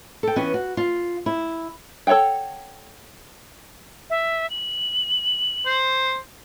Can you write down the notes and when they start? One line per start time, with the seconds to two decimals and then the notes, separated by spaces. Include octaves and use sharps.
0.23 A4 G5
0.36 E3 B3 C#4
0.54 F#4
0.77 F4
1.26 E4
2.07 A4 C#5 E5 F#5 G5
4.10 E5
4.50 F#7
5.66 C5